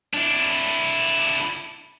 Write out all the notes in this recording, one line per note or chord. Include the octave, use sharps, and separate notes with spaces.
D4 E4